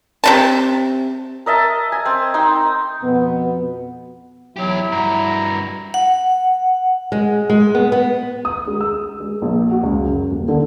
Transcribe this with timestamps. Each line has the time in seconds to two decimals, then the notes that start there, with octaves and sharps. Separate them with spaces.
0.24 C3 D#4 A5
1.46 A#4 D#5 E5 A5
1.92 G#5
2.06 C4
2.34 D#4 G5 C6
3.03 F2 B2 B3
4.56 E2 F#3 E4 G4
4.92 G2 F#4 A#5
5.94 F#5
7.12 G#3
7.50 G#3
7.75 B3
7.92 B3
8.45 D#6
8.67 G#3
8.81 E6
9.20 G#3
9.42 A#1
9.71 F#4
9.83 C#2
10.05 F#2
10.31 D#1
10.48 D3